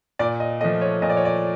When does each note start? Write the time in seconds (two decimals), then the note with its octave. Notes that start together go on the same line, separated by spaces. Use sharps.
0.19 A#2 D5
0.40 D#5
0.60 A3 D#5
0.64 F3
0.81 C#5
1.02 A#2 D#5
1.10 D5
1.17 C#5
1.25 D5